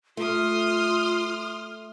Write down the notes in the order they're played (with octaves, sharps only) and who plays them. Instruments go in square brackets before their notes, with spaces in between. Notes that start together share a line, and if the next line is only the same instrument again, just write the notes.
[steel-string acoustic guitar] A3 [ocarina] F4 [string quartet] C6 D#6 F6